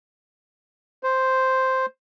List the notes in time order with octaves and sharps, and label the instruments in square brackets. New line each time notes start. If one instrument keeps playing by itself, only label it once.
[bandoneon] C5